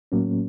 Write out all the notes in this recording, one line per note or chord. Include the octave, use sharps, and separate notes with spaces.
A2 F#3 A#3 C#4